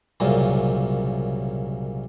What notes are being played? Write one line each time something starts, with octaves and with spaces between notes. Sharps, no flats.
C2 F#2 A#2 C#3